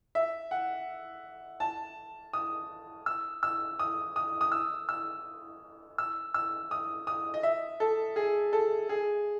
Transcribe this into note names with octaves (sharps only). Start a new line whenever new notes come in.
E5
F#5
A5
D#6
E6
E6
D#6
D#6
D#6
E6
E6
E6
E6
D#6
D#6
D#5
E5
A4
G#4
A4
G#4